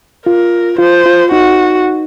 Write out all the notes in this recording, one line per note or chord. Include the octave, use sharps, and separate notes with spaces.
F4 A#4
F4 C5
F4
D#4 F#4